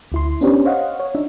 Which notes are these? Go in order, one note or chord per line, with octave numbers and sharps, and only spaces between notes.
D2 E4 C6
B3 C#4 D4 G4 C5 C#5
C5 C#5 D#5 F5 F#5
C#5
D4 D#4 E5